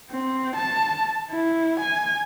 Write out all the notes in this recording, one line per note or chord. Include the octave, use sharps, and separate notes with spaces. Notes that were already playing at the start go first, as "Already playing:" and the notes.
C4
A5
E4
G#5